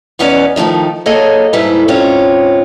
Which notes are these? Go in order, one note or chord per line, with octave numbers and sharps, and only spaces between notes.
E2 B3 C#4 D#4 B4 D5
D#3 F3 G#3 A3 D#4
F#3 A#3 G#4 A4 C#5 D#5
G#2 G3 A#3 E4 A4 B4
G#2 C4 C#4 F4 C#5